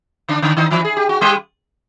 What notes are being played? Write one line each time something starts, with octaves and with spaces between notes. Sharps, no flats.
D3 D4
D3 D4
D#3 D#4
E3 E4
G#4
G4
F#4
G3 G4